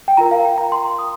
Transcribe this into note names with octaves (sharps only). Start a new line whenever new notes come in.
G5
F4 A#4 A#5
F5
G5
A#5
C6
D#6